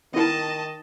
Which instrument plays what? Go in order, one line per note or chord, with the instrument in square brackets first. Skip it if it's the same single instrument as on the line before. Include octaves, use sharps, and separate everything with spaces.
[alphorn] D#3 [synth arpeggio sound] B3 E4 A#4 [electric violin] D#5 A5